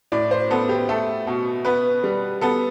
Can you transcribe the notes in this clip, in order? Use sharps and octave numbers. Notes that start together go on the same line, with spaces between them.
A2 D5
C5
B3 A4
G4
A3 A4
B2
B3 B4
G3
B3 A4